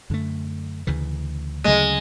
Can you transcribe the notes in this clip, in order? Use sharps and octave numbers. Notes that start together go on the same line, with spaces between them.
F#2 D3 A3
D2 C#3 E3
D2 C#3 F#3 G#3 A3